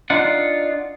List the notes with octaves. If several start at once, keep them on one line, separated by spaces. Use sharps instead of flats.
D4 D#4 F4 F#5